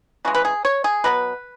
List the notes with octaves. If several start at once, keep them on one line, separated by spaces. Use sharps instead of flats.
C#3 E3 G#3 F#4
B4
G#4
C#5
G#4
B2 F#3 B3 B4